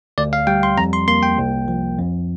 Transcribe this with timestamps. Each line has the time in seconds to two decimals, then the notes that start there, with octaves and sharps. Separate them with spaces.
0.18 D2 D5
0.33 F5
0.47 G3 G5
0.63 C6
0.77 F2 A#5
0.93 C6
1.08 A#3 C6
1.23 G5
1.38 C2
1.68 F3
1.98 F2